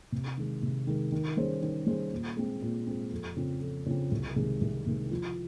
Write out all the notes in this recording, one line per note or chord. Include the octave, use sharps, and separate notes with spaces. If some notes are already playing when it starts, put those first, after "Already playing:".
C3
D#3 G#3
C3
D#3 G#3
D#3
G3 C#4 G#4 C5
D#3
G3 C#4 G#4 C5
A#2
G#3 C4
A#2
G#3 C4
F2
C#3 F3 C4
F2
C#3 F3 C4
C2
C3 D#3 G#3
C2
C3 D#3 G#3
F3